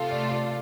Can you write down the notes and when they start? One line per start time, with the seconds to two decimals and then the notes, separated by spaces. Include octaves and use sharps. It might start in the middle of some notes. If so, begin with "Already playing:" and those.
Already playing: C3 A3 F4 A4 F5
0.11 D5
0.31 D5